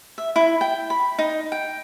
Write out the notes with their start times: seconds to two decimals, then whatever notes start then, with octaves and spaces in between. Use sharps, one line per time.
0.18 E5
0.36 E4
0.61 G5
0.90 B5
1.19 D#4
1.52 G5